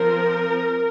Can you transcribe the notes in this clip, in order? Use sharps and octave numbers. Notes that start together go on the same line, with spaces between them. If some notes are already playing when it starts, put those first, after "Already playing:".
Already playing: F3 C4 A#4